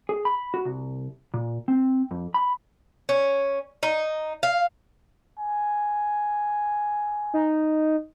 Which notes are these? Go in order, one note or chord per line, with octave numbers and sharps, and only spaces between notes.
G#4
B5
F#4
C2
A#2
C4
F2
B5
C#4
D#4
F5
G#5
D#4